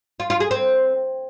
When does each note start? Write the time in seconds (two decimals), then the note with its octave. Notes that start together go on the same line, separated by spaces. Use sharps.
0.20 F4
0.30 F4
0.40 G#4
0.51 C4